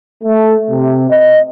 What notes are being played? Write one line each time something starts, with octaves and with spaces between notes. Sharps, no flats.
A3
C3
D#5